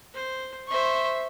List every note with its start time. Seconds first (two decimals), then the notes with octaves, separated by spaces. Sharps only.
0.14 C5
0.68 C5 E5 C6 C#6